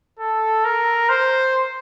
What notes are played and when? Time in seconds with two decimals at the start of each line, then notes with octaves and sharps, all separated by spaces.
0.19 A4
0.65 A#4
1.09 C5